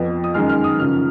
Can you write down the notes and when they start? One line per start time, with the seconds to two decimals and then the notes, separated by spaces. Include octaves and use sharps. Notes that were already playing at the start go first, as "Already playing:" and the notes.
Already playing: F2 F3 B3
0.24 D#6
0.34 F#2 D#3 G#3 F6
0.49 F6
0.64 D#6
0.79 F#2 C#3 F3 F6